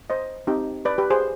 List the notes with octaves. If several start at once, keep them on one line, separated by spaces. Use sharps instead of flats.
C5 D#5
C4 D#4 G4
B4 D5
G4 B4
G#4 C5